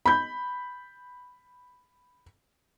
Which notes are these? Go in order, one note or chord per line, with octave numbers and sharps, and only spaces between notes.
B5 G6